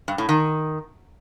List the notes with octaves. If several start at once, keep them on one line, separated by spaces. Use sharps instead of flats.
G2
A2
D#3